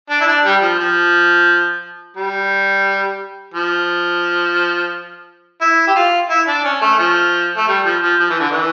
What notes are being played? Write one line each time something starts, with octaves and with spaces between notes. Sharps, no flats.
D4
E4
D4
G3
F3
F3
G3
F3
E4
G4
F4
E4
D4
C#4
A3
F3
A3
G3
F3
F3
F3
E3
D3
E3